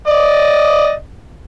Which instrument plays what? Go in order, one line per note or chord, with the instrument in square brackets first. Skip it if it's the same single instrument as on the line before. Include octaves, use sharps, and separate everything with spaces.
[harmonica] D5 D#5